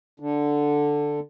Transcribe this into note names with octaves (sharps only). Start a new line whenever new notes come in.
D3